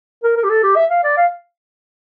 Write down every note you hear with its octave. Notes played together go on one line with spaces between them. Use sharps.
A#4
A#4
G4
A4
G4
E5
F5
D5
F5